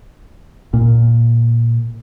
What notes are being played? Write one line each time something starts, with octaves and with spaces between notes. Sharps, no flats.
A#2